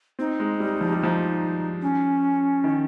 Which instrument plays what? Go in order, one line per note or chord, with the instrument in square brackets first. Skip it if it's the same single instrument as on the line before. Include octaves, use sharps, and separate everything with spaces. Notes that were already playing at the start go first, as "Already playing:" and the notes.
[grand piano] C4 [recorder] D#4
[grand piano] G#3
G3
F3
G3
F3
[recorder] C#4
[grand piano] D#3